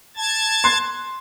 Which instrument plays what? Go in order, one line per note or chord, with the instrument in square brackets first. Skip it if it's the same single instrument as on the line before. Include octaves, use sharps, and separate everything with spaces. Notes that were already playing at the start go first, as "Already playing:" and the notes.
[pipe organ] A5 G#6 A6
[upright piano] C6 F#6 C7